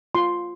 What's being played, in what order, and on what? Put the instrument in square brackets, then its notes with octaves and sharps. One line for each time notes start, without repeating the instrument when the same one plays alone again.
[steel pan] F4 C6